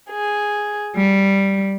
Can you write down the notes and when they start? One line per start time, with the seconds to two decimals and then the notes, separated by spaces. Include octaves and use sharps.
0.10 G#4
0.95 G3